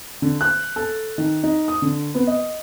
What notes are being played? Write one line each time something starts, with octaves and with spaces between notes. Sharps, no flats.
D3
F#6
A4
D#3
D#4
D#6
D3
B3
D#5